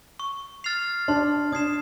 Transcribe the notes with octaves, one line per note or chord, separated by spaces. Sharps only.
C#6
F6 A6 C7 F7
D4 C6
D4 D#6 G#6 C7 E7